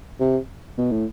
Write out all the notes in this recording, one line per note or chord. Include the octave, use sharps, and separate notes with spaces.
C3
B2
A2